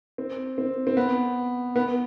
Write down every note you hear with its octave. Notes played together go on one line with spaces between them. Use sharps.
C4
C4
C4
B3
B3